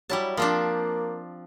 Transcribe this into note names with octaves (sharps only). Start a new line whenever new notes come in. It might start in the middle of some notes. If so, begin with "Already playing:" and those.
F#3 G3 E4 A5
F3 A#3 C4 D4